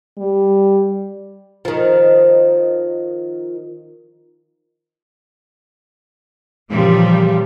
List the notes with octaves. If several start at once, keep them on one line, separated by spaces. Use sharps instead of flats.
G3
D#3 F3
A#2 C#3 E3 F3 G3